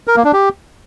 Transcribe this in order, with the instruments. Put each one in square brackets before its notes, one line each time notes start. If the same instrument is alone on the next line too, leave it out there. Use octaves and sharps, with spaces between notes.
[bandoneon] A#4
A#3
D4
G4